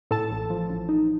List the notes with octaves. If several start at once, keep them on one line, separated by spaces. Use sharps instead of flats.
A2 A4 A5
A1
F3
A1
D#4